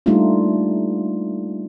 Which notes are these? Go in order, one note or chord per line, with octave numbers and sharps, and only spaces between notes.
G3 A3 A#3 D4 D#4 F4